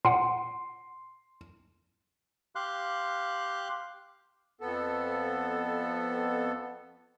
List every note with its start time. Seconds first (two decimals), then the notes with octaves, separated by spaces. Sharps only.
0.05 A#2 F#5 C6
2.55 G4 F5 C6 F#6
4.61 F2 B3 A4